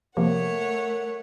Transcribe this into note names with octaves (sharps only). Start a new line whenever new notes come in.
C3 F3 A3 A#3 A#4 C#5 F#5